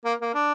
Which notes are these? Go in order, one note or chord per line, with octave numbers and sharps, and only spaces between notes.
A#3
A#3
D4